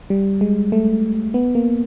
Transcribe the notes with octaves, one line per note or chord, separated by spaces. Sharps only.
G3
G#3
A3
B3
A#3